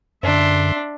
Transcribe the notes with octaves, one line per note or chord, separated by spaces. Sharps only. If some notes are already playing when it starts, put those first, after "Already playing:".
F#2 D3 D4 E5 C6